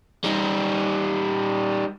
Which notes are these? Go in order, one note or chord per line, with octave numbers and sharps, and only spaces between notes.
G3 D#4